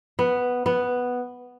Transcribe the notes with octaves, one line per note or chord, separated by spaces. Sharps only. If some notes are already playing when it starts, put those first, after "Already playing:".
B3
B3